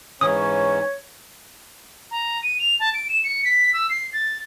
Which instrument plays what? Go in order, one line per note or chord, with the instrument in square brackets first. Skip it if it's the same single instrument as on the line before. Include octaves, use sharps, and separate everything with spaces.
[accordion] G#2 E3 C#4 [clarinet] C#5 [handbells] D#6
[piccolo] A#5
D#7
F7
A5
D7
E7
C#7
B6
E6
C7
A6